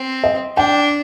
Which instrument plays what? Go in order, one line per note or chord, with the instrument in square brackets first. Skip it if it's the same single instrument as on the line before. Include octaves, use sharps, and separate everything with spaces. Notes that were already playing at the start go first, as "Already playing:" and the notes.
Already playing: [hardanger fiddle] C4
[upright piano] D#5
[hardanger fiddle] D4 [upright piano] G5